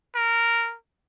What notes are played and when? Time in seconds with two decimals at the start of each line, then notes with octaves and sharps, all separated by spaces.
0.15 A#4